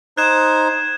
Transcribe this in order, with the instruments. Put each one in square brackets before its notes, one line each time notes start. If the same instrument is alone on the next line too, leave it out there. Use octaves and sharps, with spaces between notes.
[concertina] D#4 C5 [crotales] F#6 G#6 E7